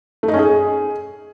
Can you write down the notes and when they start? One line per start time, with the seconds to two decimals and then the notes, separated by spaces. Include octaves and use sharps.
0.23 A3
0.28 D#4
0.34 C#4
0.39 G#4